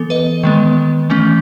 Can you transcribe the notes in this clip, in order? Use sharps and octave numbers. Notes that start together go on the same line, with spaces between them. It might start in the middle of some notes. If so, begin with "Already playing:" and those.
Already playing: E3 B3 A4
B4 D#5
D#3 G#3 B3
E3 A3 C#4